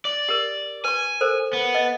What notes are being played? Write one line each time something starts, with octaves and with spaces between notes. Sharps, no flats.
D5
G4 A#4
B4 G#5 C#6
A4 A#4 C5
B3
D#5